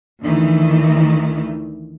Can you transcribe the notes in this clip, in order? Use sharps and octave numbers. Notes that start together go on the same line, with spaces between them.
D2 D#3 E3